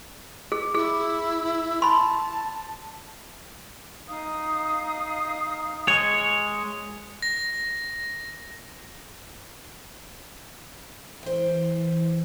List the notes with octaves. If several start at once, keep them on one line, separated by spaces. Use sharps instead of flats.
G#4
E4 G#4
A5 B5 C6
D#4 F5 D#6
G#3 C#5
A#6
E3 C5 G5